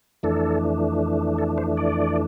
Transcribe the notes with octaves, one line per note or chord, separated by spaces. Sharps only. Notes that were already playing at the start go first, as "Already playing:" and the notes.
F2 E3 A3 D4 A4
A4
C5
D5